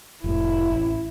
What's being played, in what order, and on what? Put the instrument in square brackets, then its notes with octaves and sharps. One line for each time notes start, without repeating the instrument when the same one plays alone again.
[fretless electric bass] F1 A2 [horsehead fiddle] E4
[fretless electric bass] A1